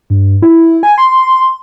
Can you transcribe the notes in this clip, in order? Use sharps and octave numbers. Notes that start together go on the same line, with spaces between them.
G2
E4
G#5
C6